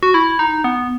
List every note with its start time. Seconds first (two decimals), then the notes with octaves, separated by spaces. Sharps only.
0.03 F#4
0.14 E4
0.39 D#4
0.64 B3